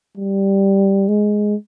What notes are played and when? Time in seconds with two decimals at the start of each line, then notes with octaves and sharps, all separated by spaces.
0.17 G3
1.08 G#3